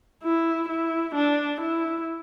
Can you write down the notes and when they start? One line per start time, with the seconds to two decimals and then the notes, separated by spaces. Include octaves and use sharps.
0.24 E4
0.69 E4
1.15 D4
1.61 E4